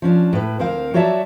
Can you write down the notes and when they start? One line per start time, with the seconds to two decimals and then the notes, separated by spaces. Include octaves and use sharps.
0.02 F3 C#4 D4
0.33 A2 B4
0.59 D2 C4 A#4 F5
0.94 F#3 F#4 C#5 D5 E5 A5